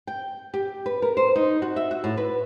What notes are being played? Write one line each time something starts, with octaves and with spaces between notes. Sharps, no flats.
G5
G4
B4
A#4
C5
D#4
F#4
E5
F#4
A2
B4